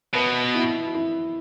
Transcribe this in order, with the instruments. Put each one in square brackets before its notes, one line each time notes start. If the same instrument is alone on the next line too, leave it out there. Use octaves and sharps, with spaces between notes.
[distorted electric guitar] B2 [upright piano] B4
[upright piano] E4
E4